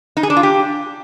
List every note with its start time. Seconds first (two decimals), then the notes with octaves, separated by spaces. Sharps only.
0.17 D#4
0.23 G#4
0.30 D4
0.37 F4
0.43 G4